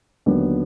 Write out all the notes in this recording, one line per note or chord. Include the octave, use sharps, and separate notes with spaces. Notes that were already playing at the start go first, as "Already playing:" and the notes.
D#2 D3 F#3 B3